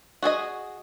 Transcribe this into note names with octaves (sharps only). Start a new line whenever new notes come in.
F#4 G#4 A4 D#5